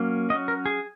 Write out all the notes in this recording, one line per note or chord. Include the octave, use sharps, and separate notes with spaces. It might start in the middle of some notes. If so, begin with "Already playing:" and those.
Already playing: F#3 A#3 C#4
F#3 C#4 D#5
A#4
G#4